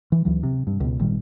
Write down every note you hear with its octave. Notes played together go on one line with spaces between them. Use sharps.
E3
D2 E3 F#3
C3
G2
C#2 B2
G#1 A#2 D#3 G3